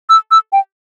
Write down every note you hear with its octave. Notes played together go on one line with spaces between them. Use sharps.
E6
E6
G5